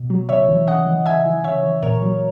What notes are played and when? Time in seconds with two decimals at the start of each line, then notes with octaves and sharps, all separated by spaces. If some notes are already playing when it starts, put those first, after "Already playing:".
Already playing: B2
0.10 F#3
0.29 C#3 C#5 E5
0.48 E3
0.67 C#3 D#5 F#5
0.86 E3
1.06 C#3 E5 G#5
1.25 E3
1.44 C#3 C#5 E5
1.63 E3
1.82 A#2 A#4 C#5
2.02 F#3